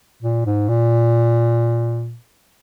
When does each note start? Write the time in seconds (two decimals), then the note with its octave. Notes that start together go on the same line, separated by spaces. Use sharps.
0.22 A#2
0.46 G#2
0.69 A#2